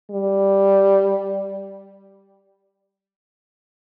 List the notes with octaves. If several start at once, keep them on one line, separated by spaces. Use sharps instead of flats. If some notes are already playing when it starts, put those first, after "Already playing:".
G3